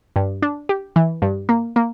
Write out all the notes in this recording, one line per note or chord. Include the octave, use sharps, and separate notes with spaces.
G2
D4
G4
E3
G2
A#3
A#3